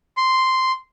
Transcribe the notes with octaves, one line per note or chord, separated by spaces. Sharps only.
C6